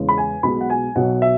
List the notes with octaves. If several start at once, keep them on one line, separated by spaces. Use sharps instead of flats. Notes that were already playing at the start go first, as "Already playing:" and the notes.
Already playing: E2 C#3 G#3
B5
G#5
B1 B2 G#3 B5
F#5
G#5
B1 B2 F#3 F#5
E5